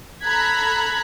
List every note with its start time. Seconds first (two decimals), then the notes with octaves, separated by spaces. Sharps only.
0.23 A4 A#5 B5 F#6 G#6 B6